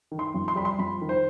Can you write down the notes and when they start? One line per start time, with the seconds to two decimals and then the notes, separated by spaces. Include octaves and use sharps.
0.11 D#3
0.19 C6
0.34 F2
0.48 C6
0.56 G3 B5
0.65 C6
0.78 F2 B5
1.01 D#3
1.09 C5